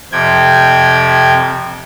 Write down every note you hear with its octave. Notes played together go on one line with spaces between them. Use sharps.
F2 C3 G5 G#6